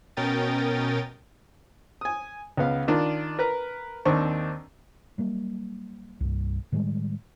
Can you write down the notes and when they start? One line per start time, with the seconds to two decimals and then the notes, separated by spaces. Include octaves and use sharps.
0.17 B2 C#4 A#4 G5 D#6 A6
2.01 G#5 D#6
2.57 C#2 B3 F5
2.88 D#3 D4 F4 A#4 D5
3.39 A#4 B4 A#5
4.05 D#2 D#3 C4 D4 C#6
5.18 F#3 G3 A#3
6.20 C2 G2
6.72 A2 D#3 G3 G#3